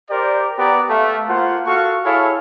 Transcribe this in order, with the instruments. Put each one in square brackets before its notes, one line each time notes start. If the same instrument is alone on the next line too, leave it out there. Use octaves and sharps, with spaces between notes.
[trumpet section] G4 A#4 C5 D5
B3 G4 D5 A#5
A3 F5
A#3 F4 C5 F#5
F#4 A4 F5 C#6
E4 G#4 A4 C#5 F5